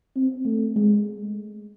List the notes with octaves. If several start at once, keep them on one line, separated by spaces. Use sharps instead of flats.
C4
A3
G#3